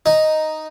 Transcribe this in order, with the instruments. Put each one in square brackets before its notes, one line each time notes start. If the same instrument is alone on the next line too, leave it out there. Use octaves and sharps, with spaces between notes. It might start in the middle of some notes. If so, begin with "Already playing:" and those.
[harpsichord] D#4